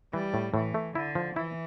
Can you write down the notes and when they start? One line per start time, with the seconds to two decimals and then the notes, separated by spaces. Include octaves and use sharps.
0.13 E3 G3
0.34 A2
0.54 A2 E3
0.74 A3
0.95 D3 E4
1.15 F3
1.36 E3 E4